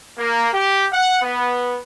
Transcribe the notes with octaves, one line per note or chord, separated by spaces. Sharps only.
A#3
G4
F#5
B3